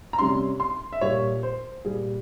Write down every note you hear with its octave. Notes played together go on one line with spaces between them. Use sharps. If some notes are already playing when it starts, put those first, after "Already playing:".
A#5
C3 G3 C#4 C6
C6
E5
A#2 G3 A#3 C#5
C5
A#2 G3 A#3 G#4